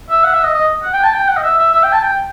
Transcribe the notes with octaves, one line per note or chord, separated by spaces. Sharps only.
E5
F#5
E5
D#5
D#5
F#5
G5
A5
G5
F#5
D#5
E5
E5
E5
G5
A5
G5